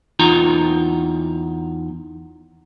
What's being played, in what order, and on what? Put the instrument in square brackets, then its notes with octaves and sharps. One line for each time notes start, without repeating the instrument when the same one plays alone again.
[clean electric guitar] E2 D#4 F4 A#5